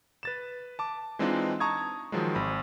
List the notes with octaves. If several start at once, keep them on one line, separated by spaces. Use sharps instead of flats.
B4 A6 E7
A5 D6
E3 G#3 C4 D4 D#4 F4
A5 A#5 C#6 D#6 G#6
D#3 F3 F#3 G#3
G#1 B5